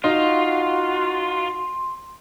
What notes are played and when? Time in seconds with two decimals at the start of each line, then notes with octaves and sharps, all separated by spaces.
0.04 D#4 F4 F#4 C6